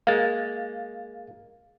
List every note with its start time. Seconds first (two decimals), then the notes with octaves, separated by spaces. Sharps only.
0.07 G#3 A#3 F5 A6